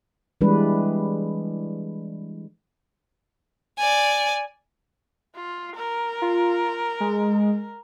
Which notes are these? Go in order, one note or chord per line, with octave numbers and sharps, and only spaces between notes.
E3 G3 G#3 D4 B4
D5 G#5
F4
A#4
F4
G#3